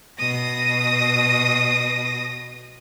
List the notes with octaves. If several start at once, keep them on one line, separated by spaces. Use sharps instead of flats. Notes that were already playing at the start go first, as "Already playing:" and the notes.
B2 D#6 A#6